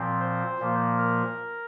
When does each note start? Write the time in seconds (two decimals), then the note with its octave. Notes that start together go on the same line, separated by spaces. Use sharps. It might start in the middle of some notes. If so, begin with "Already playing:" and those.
Already playing: A#2 F3 C4
0.19 C5
0.59 A#2 F3 A#3
0.98 A#4